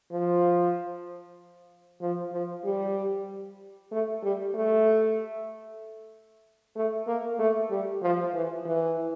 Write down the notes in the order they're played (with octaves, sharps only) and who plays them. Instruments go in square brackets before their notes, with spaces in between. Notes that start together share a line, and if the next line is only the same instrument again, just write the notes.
[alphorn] F3
F3
F3
G3
A3
G3
A3
A3
A#3
A3
G3
F3
E3
E3